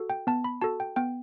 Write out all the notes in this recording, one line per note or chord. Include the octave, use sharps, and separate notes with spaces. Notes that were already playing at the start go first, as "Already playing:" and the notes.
Already playing: F#4 A4
G5
B3 A5
B5
F#4 A4 A5
G5
B3 G5